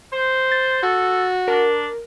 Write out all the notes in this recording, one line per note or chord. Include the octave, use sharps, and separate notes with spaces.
C5
A6
F#4 A4
D4 A#4